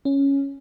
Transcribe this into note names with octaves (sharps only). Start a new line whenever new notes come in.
C#4